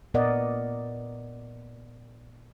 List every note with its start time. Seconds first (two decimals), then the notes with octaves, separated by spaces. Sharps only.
0.14 A#2 B3 A#4 D5 D#5 F#5